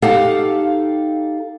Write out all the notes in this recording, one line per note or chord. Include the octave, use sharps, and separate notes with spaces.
D#4 G4 A4 F5 F#5